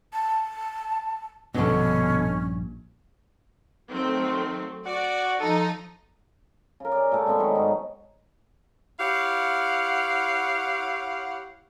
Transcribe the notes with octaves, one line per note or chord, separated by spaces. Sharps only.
A5
A#1 G2 B2 D3 C#4
D#3 F#3 A3 C4
F#4 D5
F3 D#4 A4
C#3 A#4
G#4 D5
A#2 A3
C3 G#3 A3 B3
D#3 F#3 G4 C#5
G#2 D#4
E4 G4 C#5 F5 F#5